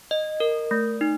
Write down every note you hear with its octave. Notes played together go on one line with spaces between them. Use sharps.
D#5
A#4
A3
D#4